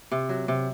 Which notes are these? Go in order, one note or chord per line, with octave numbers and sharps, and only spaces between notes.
C3
F#3
C3